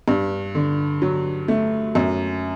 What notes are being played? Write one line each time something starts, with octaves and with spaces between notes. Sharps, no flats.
G2
D3
F#3
A3
F#2